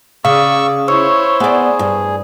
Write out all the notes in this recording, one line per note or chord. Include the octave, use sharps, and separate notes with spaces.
C#3 D5 F5 C#6 D#6 E6
E4 C5 C#5 C#6 E6
B3 G#4 D5
G2